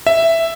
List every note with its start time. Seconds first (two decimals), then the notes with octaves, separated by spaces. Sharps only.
0.07 E5